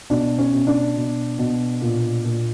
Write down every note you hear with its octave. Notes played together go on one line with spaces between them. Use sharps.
B2 D4
C#4
B2
D4
B2
B2
A#2
A#2